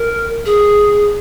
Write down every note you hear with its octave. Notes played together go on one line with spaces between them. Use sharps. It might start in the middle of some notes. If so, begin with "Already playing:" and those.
Already playing: A#4
G#4